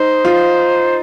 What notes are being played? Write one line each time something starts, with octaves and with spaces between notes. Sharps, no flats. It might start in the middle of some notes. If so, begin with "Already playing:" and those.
Already playing: D#4 C5
F4